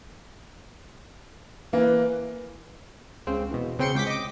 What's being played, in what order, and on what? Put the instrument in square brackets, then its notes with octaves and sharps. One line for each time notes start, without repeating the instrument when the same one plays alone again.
[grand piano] E3 A#3 [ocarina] B4
[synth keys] C#2 C#3 C4
E2 B2
C#3 C4 G5 C6 C#7
C#2 G5 D6 B6
D#5 D6